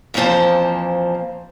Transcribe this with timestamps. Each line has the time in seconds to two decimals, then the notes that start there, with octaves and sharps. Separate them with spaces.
0.14 F2 A#2 E3 F3 C5 A5